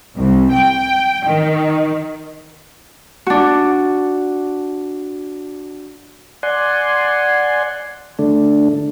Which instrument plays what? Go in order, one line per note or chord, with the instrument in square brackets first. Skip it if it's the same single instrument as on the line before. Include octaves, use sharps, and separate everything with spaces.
[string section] C2
G5
D#3
[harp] D4 F#4
[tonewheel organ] D5 F#5 G#5 C6
D3 A3 D4